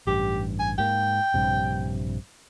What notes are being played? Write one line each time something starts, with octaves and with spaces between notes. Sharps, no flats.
A1 G2 G4
G#5
G#2 A#3 G5
A#1 G2 C3